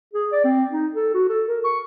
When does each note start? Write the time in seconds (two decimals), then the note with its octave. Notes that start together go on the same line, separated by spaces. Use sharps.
0.13 G#4
0.32 D5
0.44 C4
0.71 D#4
0.95 A4
1.14 F#4
1.29 A4
1.48 A#4
1.65 C#6